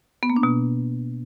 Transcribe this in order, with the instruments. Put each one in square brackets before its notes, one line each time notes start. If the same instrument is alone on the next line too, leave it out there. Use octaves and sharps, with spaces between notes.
[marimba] B3
A#3
D4
B2